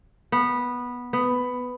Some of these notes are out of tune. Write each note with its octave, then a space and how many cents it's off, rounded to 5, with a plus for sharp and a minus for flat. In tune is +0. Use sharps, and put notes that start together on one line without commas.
B3 -10
B3 +10